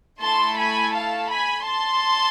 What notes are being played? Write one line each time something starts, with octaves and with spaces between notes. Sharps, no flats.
A3 E4 A4 A5 C6
G#5 B5
F5 A5
G#5 B5
A5 C6